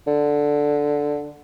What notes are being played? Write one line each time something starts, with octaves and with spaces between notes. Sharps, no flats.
D3